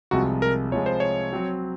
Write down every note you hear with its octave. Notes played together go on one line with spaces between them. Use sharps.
C2 C3 F3 G#3 F#4
A#4
C2 C3 F3 G#3 C#5
C5
C#5
F#3 C4 F#4